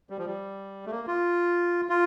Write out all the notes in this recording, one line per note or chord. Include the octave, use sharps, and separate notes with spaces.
G3
F3
G3
A3
A#3
F4
F4